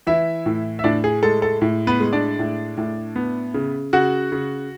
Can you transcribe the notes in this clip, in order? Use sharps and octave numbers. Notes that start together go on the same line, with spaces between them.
E3 E4 E5
A2
E5
A2 D4 D5
G#4
G#3 A4
A4
A2
B3 B4
G#3
D4 D5
A2
A2
B3
C#3
C#3 F#4 F#5
C#3